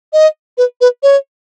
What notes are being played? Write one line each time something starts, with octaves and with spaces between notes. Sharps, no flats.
D#5
B4
B4
C#5